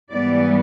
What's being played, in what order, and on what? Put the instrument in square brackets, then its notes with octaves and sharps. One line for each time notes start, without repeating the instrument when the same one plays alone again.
[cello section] G#2 E3 G3 B3 D5